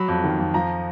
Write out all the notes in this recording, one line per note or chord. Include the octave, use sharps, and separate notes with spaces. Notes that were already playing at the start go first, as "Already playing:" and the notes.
Already playing: F#3 B5
F2
D#3
F2
F3 A#5